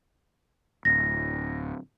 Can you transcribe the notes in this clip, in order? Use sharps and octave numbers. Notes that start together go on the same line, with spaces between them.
D1 A#6